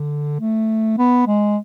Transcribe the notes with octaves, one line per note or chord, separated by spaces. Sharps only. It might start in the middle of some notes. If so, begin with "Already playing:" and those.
Already playing: D3
A3
B3
G#3